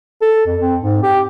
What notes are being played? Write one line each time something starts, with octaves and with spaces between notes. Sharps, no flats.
A4
F2
C4
G#2
G4